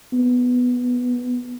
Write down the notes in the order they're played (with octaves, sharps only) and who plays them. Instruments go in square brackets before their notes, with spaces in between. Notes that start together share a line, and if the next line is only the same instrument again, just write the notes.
[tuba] B3